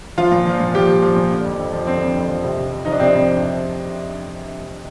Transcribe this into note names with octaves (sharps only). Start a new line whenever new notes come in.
F3 F4
A#2
F3
A#2
F3 G4
A#2
F3
A#2
D3
F2
F2
F3
D3 C4
F2
F2
F3
C3
F2
F2
F3 D#4
D4
C3 C4
F2